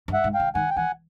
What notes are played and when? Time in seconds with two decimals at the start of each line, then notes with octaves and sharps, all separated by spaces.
0.08 G2
0.13 E5 F#5
0.24 G#2
0.34 F5 G5
0.40 D3
0.55 D#3 F#5 G#5
0.70 G5
0.76 E3 F#5 G#5